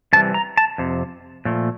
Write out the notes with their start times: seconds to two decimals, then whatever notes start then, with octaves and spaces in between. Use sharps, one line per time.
0.13 F2 C3 E3 G3 A5
0.34 A#5
0.57 A5
0.78 F2 C3
1.45 A#2 F3 A3